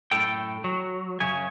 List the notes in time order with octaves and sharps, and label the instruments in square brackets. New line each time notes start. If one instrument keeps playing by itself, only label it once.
[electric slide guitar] F#2 A2 A4 G5
F#3
F#2 C#3 C#4 G#5